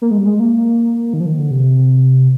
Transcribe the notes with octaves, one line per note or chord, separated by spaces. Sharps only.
A#3
G#3
G3
G#3
A#3
D#3
F3
D#3
D3
C3